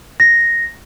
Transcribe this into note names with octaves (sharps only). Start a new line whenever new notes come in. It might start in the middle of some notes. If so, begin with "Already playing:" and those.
A#6